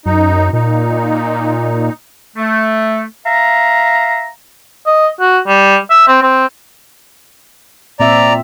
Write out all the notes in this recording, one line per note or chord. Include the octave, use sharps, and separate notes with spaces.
F#2 D#4
A#2 D#4
A3
E5 F5 A#5
D#5
F#4
G3
E5
C4
C4
A#2 C4 D5 E5 A#5